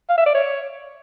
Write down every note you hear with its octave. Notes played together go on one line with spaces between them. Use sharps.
F5
E5
D5
C#5